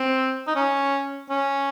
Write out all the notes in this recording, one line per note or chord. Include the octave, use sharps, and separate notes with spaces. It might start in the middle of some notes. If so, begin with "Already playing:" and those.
Already playing: C4
D#4
C#4
C#4